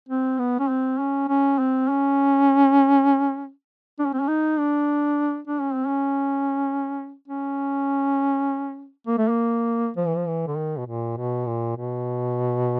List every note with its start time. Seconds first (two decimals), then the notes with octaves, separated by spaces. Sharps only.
0.09 C4
0.39 B3
0.59 C#4
0.69 C4
1.00 C#4
1.29 C#4
1.59 C4
1.88 C#4
3.99 D4
4.06 C#4
4.13 C4
4.20 C#4
4.28 D#4
4.59 D4
5.48 D4
5.61 C#4
5.74 C4
5.87 C#4
7.28 C#4
9.07 A#3
9.18 A3
9.28 A#3
9.97 F3
10.07 E3
10.17 F3
10.27 E3
10.47 D3
10.57 D#3
10.79 B2
10.87 A#2
11.17 B2
11.47 A#2
11.77 B2